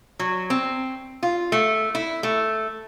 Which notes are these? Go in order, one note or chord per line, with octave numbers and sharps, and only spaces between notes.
F#3
C4
F4
A3
E4
A3